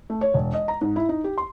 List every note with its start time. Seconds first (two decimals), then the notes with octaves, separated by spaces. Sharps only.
0.10 A3
0.21 C#5
0.34 E1
0.53 D#5
0.68 A#5
0.81 G#2
0.96 E4
1.09 D#4
1.24 G4
1.38 C6